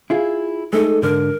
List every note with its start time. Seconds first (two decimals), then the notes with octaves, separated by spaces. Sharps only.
0.10 E4 F4 G#4
0.73 G#3 A3 D#4 A4
1.02 G#2 D3 A#4